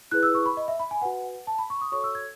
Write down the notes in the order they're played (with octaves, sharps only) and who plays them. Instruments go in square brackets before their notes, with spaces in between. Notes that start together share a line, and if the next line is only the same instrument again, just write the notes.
[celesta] E4 G#4 B4 F#6
E6
C#6
B5
D#5
E5
B5
G#5
F#4 B4 F#5
A5
B5
C#6
D#6
F#4 A4 C#5 C#6
E6
G#6